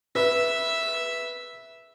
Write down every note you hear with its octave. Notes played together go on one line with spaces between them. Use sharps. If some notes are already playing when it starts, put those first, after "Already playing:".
B4 E5